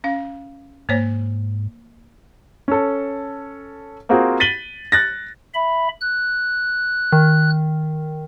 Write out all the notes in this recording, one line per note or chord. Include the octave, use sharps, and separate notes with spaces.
C#4 F5
G#2 A#3 C5 C#5
C#4 A4
A#3 C4 F4 F#4 G#4
A6 B6 D#7 F#7 G7
F#6 A6 A#6
E5 B5
F#6
D#3